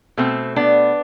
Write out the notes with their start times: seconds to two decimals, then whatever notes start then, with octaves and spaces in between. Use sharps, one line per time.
0.17 B2 A3 C4
0.56 B3 D4